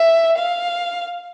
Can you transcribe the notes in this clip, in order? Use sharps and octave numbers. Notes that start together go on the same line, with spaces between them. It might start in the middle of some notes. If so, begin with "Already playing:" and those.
Already playing: E5
F5